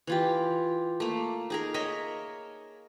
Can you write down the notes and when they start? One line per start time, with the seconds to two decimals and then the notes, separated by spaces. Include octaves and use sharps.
0.07 E3 F4 G4
1.00 A3 A#3
1.50 D#4 G#4 A#4
1.74 A#4 C#5 D#5 E5